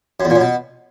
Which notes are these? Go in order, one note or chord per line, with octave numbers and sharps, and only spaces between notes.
F#2
E2
A#2
F#2
B2